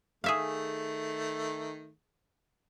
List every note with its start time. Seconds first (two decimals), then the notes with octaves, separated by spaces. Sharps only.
0.24 D#3 A3 G#4 E5 F5